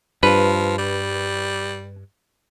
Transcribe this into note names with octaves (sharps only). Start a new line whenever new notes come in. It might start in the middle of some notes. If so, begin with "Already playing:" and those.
G2 F3 B4
G3